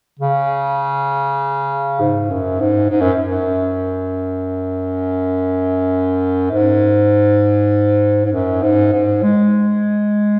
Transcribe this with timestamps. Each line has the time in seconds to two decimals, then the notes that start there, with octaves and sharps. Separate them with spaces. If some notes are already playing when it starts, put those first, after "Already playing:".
0.20 C#3
2.00 G#2
2.30 F#2
2.60 G#2
2.90 G#2
3.01 F#2
3.23 F#2
6.51 G#2
8.25 G#2
8.33 F#2
8.62 G#2
8.93 G#2
9.23 G#3